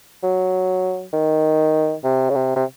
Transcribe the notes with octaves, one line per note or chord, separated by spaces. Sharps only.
F#3
D#3
C3
C#3
C3
C3